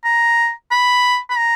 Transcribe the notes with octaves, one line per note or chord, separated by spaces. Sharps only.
A#5
B5
B5
A#5